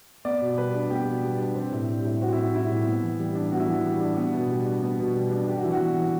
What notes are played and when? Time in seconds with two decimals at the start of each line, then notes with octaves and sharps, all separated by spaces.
0.25 B3 D5
0.41 B2
0.58 G3 B4
0.74 D4
0.90 B3 G4
1.07 B2
1.24 G3
1.39 D4
1.55 C4
1.72 A2
1.89 G3
2.05 A2
2.21 C4 F#4
2.33 A2 E4
2.54 G3 E4
2.70 A2
2.87 B3
3.03 E3
3.19 G3
3.35 D4
3.52 B3 F#4
3.60 E4
3.68 E3 F#4
3.85 G3
4.01 D4
4.17 B3
4.34 B2
4.50 G3
4.66 D4
4.83 B3
4.99 B2
5.15 G3
5.31 D4
5.48 D4 G4
5.57 F#4
5.64 E3 E4
5.72 F#4
5.81 B3
5.98 E3